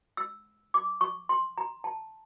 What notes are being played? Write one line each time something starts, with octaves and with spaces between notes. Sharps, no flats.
E6
D6
C#6
C6
A#5
A5